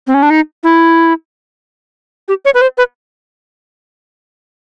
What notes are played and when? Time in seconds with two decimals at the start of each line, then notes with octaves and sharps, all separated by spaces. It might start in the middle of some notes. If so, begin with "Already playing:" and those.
0.07 C4
0.14 C#4
0.23 D4
0.30 D#4
0.63 E4
2.28 G4
2.45 C#5
2.54 B4
2.61 C5
2.78 B4